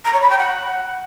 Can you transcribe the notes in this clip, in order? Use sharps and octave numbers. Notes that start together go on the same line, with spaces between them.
A#5
C#5
B5
G5
F#5